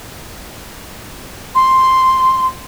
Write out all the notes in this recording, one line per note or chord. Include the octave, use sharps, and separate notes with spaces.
C6